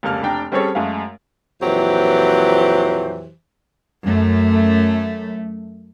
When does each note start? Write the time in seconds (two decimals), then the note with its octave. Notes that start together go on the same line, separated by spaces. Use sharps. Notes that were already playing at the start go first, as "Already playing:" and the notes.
0.03 F1 C#2 A#3 A5 F6
0.22 F1 D4 G5 A5 A#5
0.52 G3 C4 C#4 G#4 A4 C#5
0.75 F#2 G#3 A3 F5
1.61 F2 A#2 E3 F#3 G4 C5
4.04 F#2 A3